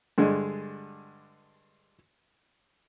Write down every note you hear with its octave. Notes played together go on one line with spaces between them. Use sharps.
G2 D3 G#3